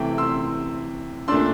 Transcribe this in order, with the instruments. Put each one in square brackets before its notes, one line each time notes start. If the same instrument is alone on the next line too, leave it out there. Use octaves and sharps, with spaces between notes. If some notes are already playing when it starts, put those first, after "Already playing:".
Already playing: [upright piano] C3 E3 A3 G5
C6 E6
D4 C6 E6
A#2 A3